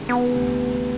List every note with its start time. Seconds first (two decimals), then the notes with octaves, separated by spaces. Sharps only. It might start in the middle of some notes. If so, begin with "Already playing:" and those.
Already playing: C3 D#3 G#3 C#4
0.09 B3
0.31 D2 C3 E3